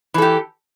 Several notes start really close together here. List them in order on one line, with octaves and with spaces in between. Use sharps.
E3 A4 G4